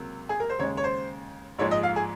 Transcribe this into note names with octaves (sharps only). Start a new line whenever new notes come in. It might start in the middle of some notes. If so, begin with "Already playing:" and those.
Already playing: C#2 C3 F#3 A#3
G#4
A#4
C5
D#2 C#3 G#3 C#5
C#5
C5
A#1 G#2 F3 G#3 C#5
D#5
F5
G#4